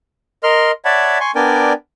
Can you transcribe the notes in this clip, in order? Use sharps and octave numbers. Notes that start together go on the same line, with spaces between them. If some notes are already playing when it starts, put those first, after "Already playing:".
A#4 D#5 C6 F6
C#5 D5 E5 F#5 A5 B5
G#5 C6 C#6
B3 D4 A#4 D5 G5 G#5